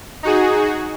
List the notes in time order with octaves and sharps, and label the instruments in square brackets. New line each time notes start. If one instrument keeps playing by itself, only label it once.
[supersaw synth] D#4 F#4 G#4